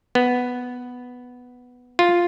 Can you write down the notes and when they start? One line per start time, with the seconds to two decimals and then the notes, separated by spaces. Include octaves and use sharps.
0.15 B3
1.99 F4